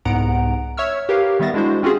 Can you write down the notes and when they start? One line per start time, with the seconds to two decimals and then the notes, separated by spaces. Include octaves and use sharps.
0.05 C2 G#2 B3 F#5 A#5 D7
0.77 C#5 E5 C#6 E6 F6
1.09 G4 A#4 B4 C#5 F5
1.39 D#3 G3 B3 E5 A6 A#6
1.54 G#3 D4 E4 F#4 C5
1.83 C4 C#4 F4 F#4 G#4